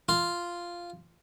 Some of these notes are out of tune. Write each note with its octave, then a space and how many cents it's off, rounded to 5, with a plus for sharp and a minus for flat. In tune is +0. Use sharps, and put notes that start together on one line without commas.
F4 -5